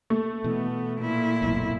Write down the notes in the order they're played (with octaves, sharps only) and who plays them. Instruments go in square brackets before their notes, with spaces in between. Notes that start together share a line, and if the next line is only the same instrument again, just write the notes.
[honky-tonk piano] A3
[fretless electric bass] B2 E3 [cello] B3
[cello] A#2 E4
[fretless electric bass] F#1 B1 F2